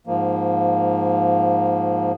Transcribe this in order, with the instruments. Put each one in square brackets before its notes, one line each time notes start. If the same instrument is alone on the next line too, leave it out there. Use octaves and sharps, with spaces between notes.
[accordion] G#2 F3 A#3